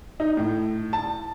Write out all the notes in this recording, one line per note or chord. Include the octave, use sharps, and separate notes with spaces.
D#4
A2
A5